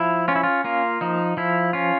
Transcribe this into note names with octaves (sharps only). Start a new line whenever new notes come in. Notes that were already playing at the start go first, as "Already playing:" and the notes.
Already playing: F3 E4
C#4 F4
E4
F4
A#3 F4
F3 D#4
F3 E4
C#4 F4